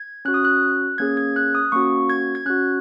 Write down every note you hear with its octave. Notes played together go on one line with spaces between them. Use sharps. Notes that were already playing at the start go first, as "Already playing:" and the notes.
Already playing: G#6
C#4 F#4 F#6
D#6
F#6
A#3 C#4 G#4 G#6
G#6
F#6
D#6
A#3 C#4 F#4 C#6
G#6
G#6
C#4 F#4 F#6